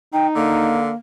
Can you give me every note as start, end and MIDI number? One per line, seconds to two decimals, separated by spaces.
0.14 0.81 63
0.14 0.27 79
0.35 0.90 50
0.35 0.95 58